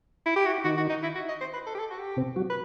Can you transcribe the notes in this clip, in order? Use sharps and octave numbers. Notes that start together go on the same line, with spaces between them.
E4
G4
F#4
E4
D#3 D#4 F#4
F#4
D#4
E4
F#4
D#5
C5
B4
A4
G4
A4
F#4
G4
C3 C4
F#3 F#4
B4